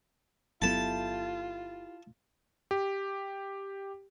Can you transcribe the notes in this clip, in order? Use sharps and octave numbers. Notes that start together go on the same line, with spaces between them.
G1 F#3 B3 E4 F4 G4 A4 A5
G4